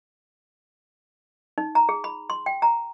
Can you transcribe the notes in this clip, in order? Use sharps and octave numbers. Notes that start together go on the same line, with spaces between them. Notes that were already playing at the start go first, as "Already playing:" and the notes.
D#4
A#5
G#4
B5
C6
G5
A#5